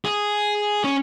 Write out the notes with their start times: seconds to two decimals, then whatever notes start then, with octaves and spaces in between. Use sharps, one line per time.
0.05 G#4
0.84 C#4